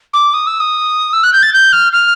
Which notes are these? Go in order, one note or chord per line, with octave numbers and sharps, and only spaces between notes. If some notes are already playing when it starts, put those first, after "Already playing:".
D6
D#6
E6
D#6
E6
F#6
G6
A6
G6
F6
F6